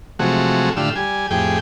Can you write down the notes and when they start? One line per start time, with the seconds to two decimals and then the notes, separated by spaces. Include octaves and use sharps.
0.19 C3 F3 F#3 G#3 A3 F#4
0.77 A2 D3 F4 G4 E6
0.96 G3 G#5
1.31 F2 A2 G4 G#4 G5